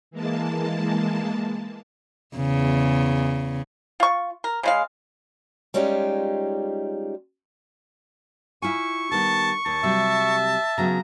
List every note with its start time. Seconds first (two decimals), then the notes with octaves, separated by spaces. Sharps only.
0.11 E3 G#3 A#3 A5
2.37 E2 C#3
4.00 F4 C#6
4.44 A#4
4.63 C#3 G#3 F5
5.74 G3 G#3 C#4 D#4 F4 G4
8.62 E4 F4 G#5 C#6
9.12 D#3 G3 B3 A5
9.66 D#2 A5
9.84 C3 F#3 G3 E5
10.78 C#3 F#3 B3 A#5